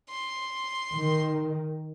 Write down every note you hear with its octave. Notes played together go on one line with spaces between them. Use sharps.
C6
D#3